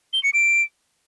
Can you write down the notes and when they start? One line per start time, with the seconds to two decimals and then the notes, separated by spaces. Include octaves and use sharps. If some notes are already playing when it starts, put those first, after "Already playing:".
0.13 G7
0.23 C#7
0.34 D7